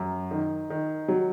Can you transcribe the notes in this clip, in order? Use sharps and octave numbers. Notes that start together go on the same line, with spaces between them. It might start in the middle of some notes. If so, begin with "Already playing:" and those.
Already playing: F#2
D#3
D#3
F#3